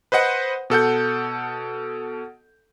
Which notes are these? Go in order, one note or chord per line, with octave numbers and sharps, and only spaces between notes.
B4 C5 D#5 F#5
B2 A4 F#5 G6